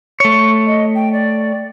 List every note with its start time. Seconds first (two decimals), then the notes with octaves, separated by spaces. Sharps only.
0.20 A3 C#5 C#6
0.66 D#5
0.95 G5
1.13 D5